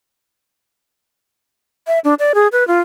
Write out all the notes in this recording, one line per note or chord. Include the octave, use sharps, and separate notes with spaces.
E5
D4
D5
G#4
B4
F4